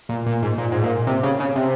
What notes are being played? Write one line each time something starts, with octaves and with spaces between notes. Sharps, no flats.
A#2
A#2
G#2
A#2
G#2
A#2
C3
C#3
C#3
C3